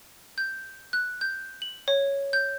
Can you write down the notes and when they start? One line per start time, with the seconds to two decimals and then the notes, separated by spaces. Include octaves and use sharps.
0.38 G6
0.93 F#6
1.21 G6
1.62 F#7
1.88 C#5
2.33 G6